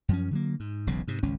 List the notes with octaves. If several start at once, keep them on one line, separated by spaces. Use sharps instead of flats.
F#2 F3 C#4
D3 F#3 A#3
G#2
E1 B1 C#3
G#2 C3
G#1 C#2 C#4